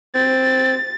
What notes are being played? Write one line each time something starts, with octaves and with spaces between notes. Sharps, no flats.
C4 A6